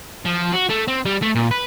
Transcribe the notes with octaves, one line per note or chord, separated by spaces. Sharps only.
F3
F#4
A3
C4
G3
A3
A#2
B4